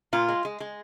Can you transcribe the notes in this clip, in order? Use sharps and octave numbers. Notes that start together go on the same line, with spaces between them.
A#2 F4
G#3
G#3
G#3